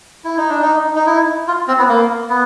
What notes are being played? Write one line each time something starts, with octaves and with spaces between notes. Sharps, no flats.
E4
D#4
D4
D#4
D#4
E4
F4
C4
B3
A#3
B3